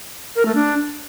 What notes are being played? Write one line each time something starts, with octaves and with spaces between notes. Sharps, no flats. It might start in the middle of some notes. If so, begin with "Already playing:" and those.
A#4
A3
D4